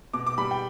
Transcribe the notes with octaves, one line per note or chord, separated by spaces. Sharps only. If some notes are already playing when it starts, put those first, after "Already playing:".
B2 D6
D6
G3 B5
G5